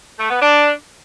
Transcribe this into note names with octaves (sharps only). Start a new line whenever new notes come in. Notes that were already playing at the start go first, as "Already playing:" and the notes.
A3
B3
D4